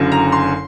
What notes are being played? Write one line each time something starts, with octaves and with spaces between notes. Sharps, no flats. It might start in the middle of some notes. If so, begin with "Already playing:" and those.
Already playing: F#1 F#2 D3
A#5
C6